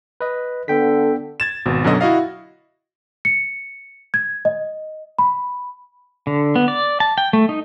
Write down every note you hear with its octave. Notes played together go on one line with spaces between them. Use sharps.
B4 D#5
D3 B3 A4 G5 B6
G#6 A6 E7
G#1 B2
F#2 B2 D3 F#3 D#5 A#6
E4 F#4 D#5 F5
C#7
G#6
D#5
B5
D3
B3
D5
A5
G5
A3
D#4